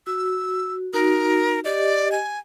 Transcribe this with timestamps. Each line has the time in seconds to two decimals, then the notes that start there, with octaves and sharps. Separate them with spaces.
0.07 F#4 E6
0.93 D#4 F#4 A#4
1.64 G4 D5 D#5
2.12 G#5